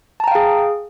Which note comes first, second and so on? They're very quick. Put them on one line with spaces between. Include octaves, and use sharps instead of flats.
A5 A#5 G5 F5 G#4